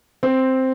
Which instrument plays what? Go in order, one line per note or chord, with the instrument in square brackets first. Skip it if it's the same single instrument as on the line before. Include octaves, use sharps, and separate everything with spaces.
[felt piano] C4